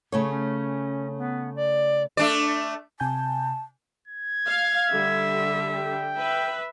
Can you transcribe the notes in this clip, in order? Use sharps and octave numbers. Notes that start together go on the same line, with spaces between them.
C#3 A3 C#5
C#4
B3
D5
A3 D4 D5
C3 G#5 A5 G6
G#6
F5
D3 G3 E5
G5
B4 E5